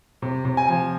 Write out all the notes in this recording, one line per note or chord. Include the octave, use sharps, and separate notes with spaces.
C3
C3
G#5
F3